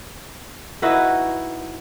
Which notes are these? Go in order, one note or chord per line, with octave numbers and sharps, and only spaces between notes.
D#4 E4 F#4 B4